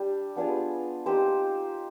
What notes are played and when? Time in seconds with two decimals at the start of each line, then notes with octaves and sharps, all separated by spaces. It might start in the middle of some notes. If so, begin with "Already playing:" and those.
Already playing: G3 D4 G4
0.36 B3 D4 F4 G#4
1.06 C4 D#4 G4 C5